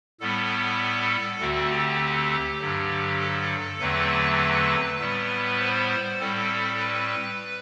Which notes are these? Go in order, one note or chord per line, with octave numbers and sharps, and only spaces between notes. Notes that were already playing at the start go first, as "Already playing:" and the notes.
A2 G3 B3 A4
D2 D3 A3 C4 F#4
G4
G2 D3 F#3
A4
E2 D3 F#3 A3 C4 B4
A2 G3 B3
C5
A2 G3 C4 A4
B4